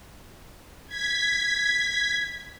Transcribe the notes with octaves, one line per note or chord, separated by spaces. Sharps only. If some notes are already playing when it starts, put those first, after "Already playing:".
G#6 B6